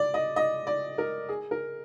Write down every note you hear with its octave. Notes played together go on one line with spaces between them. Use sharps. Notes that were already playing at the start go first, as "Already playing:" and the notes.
Already playing: D5
D#5
D#5
D5
A#4
G#4
A#4